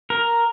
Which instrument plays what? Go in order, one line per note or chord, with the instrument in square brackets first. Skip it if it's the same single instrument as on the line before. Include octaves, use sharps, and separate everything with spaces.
[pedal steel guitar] A#4